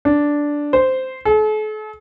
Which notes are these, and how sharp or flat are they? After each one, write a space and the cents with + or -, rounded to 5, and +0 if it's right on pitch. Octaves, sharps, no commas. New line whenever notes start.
D4 -5
C5 -10
A4 -45